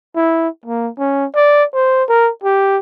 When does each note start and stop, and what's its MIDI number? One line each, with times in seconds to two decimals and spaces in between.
0.16 0.48 64
0.65 0.90 58
0.99 1.26 61
1.35 1.65 74
1.74 2.04 72
2.09 2.31 70
2.44 2.79 67